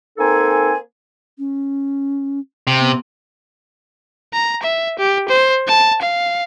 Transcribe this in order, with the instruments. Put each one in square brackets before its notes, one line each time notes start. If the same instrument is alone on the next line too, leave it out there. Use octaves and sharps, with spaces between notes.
[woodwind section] A#3 C4 D#4 A4 G#5
[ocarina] C#4
[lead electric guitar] C3
[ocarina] B3
[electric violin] A#5
E5
G4
C5
A5
F5